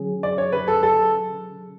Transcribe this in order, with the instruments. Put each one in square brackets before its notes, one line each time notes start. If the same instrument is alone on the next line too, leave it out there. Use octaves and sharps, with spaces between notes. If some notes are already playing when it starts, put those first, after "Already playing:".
Already playing: [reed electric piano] D3 F#3 C#4 G#4
[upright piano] D5
C#5
B4
A4
A4